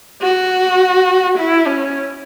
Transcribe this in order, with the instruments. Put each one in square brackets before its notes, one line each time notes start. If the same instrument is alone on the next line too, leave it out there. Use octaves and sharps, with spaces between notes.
[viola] F#4
E4
C#4